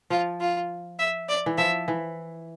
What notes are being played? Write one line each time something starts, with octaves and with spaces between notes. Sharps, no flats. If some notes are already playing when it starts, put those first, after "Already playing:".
F3 F4
F4
E5
D5
E3
F3 E5
E3